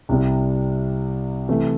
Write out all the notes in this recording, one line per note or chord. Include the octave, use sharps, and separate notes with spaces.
C2 C3 G3
C3 E3 A3